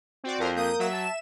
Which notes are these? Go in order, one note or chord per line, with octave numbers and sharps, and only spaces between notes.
C4 F#4 D5
F2 A#4 C5
A#3 D#6 G6
F#3 E5 E7
A5